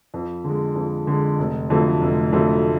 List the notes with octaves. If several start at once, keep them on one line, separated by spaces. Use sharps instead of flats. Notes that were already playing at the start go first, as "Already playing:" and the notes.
F2
D3 G#3
F2
D3 G#3
F1
F2 D3 F#3 A3
F1
F2 D3 F#3 A3